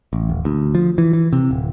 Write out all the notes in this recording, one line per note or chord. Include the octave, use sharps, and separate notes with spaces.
A1
D#1
D2
F3
E3
E3
C3
D1